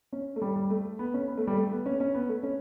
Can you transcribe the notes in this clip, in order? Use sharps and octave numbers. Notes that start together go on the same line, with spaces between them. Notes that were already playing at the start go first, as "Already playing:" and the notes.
C#4
A3
G3
G3
A3
B3
C#4
B3
A3
G3
A3
B3
C#4
C#4
B3
A3
C#4